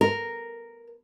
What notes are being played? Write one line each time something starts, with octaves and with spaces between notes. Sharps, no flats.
A#4